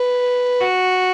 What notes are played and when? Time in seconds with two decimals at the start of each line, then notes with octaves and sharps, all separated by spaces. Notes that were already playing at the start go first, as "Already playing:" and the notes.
Already playing: B4
0.61 F#4